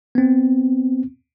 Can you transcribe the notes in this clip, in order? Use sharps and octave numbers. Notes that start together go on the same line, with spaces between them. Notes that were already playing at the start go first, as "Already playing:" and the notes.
B3 C4